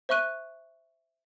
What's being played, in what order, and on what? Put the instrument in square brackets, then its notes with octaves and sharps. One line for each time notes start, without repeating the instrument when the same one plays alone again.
[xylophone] C5 E5 C#6 F#6 D#7